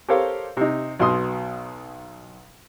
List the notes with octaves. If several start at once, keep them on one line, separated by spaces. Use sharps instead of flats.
G4 A4 A#4 C5 C#5 F5
C3 D#4
B1 B2 C6 D#6